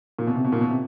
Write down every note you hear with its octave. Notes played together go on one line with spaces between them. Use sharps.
A#2
B2
C3
B2
A#2
B2
C3